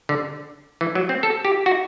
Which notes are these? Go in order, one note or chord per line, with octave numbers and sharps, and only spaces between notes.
D3
E3
F#3
C4
A4
G4
F#4